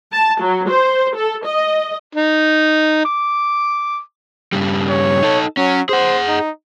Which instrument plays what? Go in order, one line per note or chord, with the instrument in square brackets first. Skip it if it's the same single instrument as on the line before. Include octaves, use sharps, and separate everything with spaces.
[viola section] A5
F#3
C5
A4
D#5
[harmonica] D#4
D6
[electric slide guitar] G2 C#3 G3
[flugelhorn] C#5
[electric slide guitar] D#4 A4
[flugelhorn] F#3 [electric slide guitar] C#4
[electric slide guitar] G#4 F#5 [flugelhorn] C5
[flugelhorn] D#4